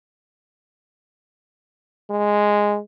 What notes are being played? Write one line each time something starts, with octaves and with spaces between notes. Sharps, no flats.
G#3